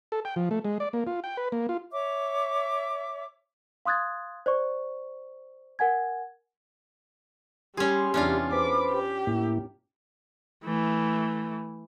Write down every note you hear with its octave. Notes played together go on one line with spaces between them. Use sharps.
A4
G5
F3
A3
G#3
D5
A#3
F4
G5
B4
A#3
F4
C#5 E5 D6
F5 C6 D#6 F#6 G#6 A6
C5 D5 C#6
A#4 F#5 G#5 G#6
G3 C#4 G4 G#4 C6
E2 C3 C#4 D4 F4
B4 C5 B5 D6
G4
A2 A#3 E4
E3 A3